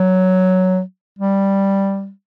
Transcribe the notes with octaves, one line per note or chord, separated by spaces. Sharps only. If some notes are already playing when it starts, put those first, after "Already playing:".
Already playing: F#3
G3